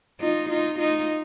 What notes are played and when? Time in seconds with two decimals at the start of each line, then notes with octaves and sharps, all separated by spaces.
0.20 D#4 F4
0.49 D#4 F4
0.79 D#4 F4